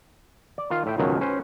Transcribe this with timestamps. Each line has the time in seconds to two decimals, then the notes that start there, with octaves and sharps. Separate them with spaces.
0.58 D5
0.71 D#3 F4 F5
0.86 A2 E5 G5
0.98 C#2 F#2 B2 D#3 F3 F#3
1.21 C#4 B4 C5